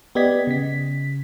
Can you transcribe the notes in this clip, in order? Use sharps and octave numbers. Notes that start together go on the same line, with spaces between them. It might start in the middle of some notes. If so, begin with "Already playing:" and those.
B3 G4 D5 D#5 G#6 B6
C#3 B6